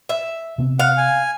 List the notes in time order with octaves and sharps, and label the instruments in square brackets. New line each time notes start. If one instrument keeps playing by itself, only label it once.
[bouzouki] E5
[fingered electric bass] C3 B3 C4
[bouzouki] F5 [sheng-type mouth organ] F#5
[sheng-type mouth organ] G#5